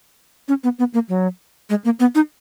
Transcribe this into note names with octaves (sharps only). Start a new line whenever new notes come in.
C#4
B3
B3
A#3
F#3
G#3
A#3
B3
D#4